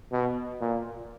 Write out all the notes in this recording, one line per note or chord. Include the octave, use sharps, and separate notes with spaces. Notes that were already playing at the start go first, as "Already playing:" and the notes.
B2
A#2